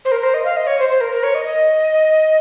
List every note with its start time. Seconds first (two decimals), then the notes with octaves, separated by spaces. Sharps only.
0.05 C5
0.12 A#4
0.23 C5
0.34 D#5
0.45 F5
0.56 D#5
0.67 C#5
0.79 C5
0.89 C5
1.01 A#4
1.12 A#4
1.23 C#5
1.35 D#5
1.45 D#5